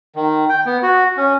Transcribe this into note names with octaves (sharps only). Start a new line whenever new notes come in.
D#3
G5
B3
F#4
C#4